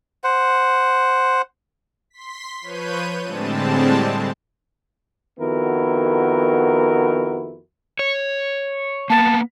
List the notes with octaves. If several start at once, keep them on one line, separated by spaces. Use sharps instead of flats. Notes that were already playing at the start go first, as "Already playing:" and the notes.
C5 F#5
C6 B6
F3 B4 C#5 G6 D#7
A2 D3 G3 G#3 C4 A5
F2 D#3 B3 E4 F#4 A#4
C#5
A#3 B3 A5